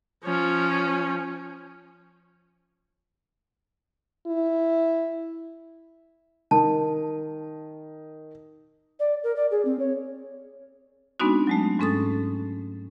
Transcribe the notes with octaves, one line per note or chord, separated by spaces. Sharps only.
F3 C#4
E4
D#3 A5
D5
A#4
D5
G#4
C4
C#5
G#3 B3 C4 D4 D#4 F#4
F#3 G#3 A3
G#2 G#3 C#4 A4 D#6 A6